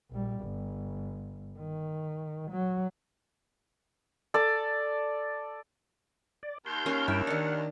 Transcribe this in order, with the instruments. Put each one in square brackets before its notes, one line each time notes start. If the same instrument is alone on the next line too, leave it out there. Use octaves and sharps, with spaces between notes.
[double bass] A#1 G3
G1
D#3
F#3
[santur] A4 D5
[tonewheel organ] D5
[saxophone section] D#2 [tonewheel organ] C6 G6
[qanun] A#3 C#4 A#4
[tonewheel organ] G2 E4 G5 [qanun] E5
[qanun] D#3 D4 [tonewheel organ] F#5